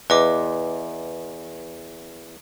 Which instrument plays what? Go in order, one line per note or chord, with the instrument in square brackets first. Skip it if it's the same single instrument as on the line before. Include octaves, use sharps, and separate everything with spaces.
[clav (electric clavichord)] E2 [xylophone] B4 D#5 D6